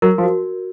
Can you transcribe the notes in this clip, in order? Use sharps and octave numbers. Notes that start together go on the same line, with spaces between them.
F#3 A#4
F3
F#4